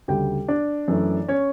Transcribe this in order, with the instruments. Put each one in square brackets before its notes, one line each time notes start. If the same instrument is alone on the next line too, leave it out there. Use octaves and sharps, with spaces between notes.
[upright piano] D2 C#3 G3 G4 G5
D4 D5
F#2 E3 A3
C#4 C#5